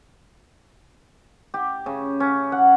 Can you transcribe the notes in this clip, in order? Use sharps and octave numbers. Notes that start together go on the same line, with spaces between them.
G4
C#3
C#4
F#5